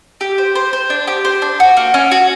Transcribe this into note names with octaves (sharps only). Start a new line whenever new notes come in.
G4
C5
C5
C5
D4
G4
C5
D4
F#4
A#3
C#4
F#4